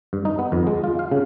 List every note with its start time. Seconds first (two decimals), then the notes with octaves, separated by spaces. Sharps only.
0.13 G2
0.25 D#4
0.39 B3
0.52 F2
0.67 G#3
0.84 F4
0.99 F5
1.12 C#3